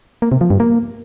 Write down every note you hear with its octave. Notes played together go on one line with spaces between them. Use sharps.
A#3
C3
F3
G2
A#3